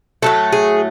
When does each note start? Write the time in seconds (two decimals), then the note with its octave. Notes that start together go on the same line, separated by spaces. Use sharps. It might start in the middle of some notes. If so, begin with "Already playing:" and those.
0.22 A2 F#3 A3 A4
0.53 G#4